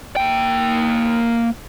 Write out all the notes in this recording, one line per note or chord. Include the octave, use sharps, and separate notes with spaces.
A#3 G5